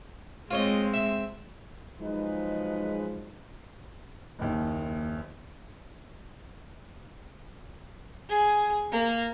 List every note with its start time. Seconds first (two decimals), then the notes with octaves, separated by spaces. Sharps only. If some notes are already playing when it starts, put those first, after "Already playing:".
0.51 G#3 C4 F4 C#5 D#5
0.94 E5
2.00 F3 F#3 G#3 D#4 B4
4.39 F#1 D#2
8.30 G#4
8.92 A#3